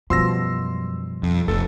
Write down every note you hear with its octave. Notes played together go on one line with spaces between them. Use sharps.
F#2 B2 F3 G3 C6 E6 A#6
F2
F1 A3 A4